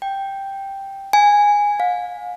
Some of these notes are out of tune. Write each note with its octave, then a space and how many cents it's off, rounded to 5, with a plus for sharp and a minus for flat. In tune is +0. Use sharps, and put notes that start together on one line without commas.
G5 +0
G#5 -10
F5 +40